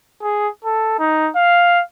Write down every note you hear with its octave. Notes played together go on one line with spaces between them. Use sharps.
G#4
A4
D#4
F5